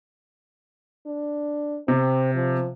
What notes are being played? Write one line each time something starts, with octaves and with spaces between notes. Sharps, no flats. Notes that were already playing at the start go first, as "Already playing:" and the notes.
D4
C3 C4
F3